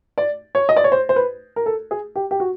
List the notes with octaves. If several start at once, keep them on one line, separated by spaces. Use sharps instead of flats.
D5
C#5
D#5
D5
C#5
C5
C5
B4
A#4
A4
G#4
G4
G4
F#4